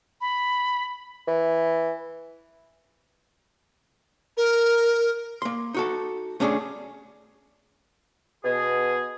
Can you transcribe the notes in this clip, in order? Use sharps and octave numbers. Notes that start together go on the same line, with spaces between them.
B5
E3
A#4
A#3 C6
D#4 F#4 A4
A3 C#4 D4 F#4 G#4
B2 G#4